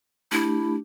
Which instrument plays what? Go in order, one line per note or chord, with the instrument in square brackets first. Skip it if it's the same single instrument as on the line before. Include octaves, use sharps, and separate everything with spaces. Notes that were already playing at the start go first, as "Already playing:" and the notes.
[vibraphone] A3 D4 G4 [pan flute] E4